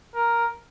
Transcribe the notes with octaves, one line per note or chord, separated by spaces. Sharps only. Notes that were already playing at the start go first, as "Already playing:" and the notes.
A#4